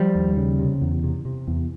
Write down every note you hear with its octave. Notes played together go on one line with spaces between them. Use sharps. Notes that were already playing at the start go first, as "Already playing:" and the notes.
Already playing: F3 G3
D#2
C#3
C3
E2
C3
C3
E2